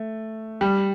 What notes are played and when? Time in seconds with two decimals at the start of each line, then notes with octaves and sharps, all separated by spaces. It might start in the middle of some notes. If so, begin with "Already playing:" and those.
Already playing: A3
0.61 G3